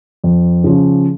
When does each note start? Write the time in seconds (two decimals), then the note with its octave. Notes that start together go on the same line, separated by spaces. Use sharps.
0.24 F2
0.64 C#3 F3 C#4